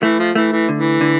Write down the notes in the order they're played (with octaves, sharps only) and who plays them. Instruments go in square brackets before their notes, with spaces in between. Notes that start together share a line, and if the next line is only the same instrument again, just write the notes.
[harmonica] E3 [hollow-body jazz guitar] A3
[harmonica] F3
[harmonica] E3 [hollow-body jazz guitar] A3
[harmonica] E3
[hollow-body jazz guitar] D3
[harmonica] E3
[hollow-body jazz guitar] D3